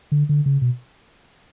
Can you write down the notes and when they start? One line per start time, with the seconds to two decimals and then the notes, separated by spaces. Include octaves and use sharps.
0.12 D3
0.29 D3
0.46 C#3
0.61 B2